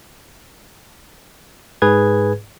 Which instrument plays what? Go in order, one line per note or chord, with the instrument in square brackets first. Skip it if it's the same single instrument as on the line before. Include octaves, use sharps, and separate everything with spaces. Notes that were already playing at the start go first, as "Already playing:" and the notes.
[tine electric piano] G#2 G#4 B4 G#6